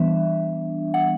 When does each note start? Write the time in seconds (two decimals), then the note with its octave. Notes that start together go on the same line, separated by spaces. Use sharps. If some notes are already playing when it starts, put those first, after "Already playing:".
Already playing: E3 G3 B3 D4 E5
0.94 F#5